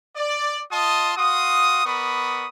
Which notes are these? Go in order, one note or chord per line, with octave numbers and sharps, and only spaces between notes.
D5
F4 D#5 A5 C6 D#6
F#4 F5 C6 D#6
B3 A#4 D5 B5 C#6 D#6